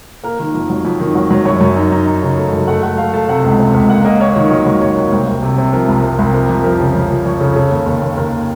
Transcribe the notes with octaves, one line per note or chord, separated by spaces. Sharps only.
A#3 A#4
D#3
F2
F#3
F2
D#3
F#3
F#3
F#2 C#5
F#2
D#4
D#4
D#4
C#3
A3
F#2
A3 F#5
A3 F#5
A3 F5
A3 A5
C3 F#5
C#2
C3
C#2
A#3 F#5
A#3 D#5
A#3 C#5
D#3
F#3 D#5
F#3
D#2 C#5
A#3
C2 C5
C2
C3
C3
F3 A#4
C2
C3
C2
F3 A#4
F2
F3 A#4
C#3
F2
F2
F2 C#5
C#3 A4
C#3 A4
D#2
D#2
D#2
D#2 A#4